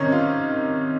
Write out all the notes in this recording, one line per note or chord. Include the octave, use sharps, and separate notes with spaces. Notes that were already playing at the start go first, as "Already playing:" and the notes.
Already playing: C3 D#3 C#4 D#4
F4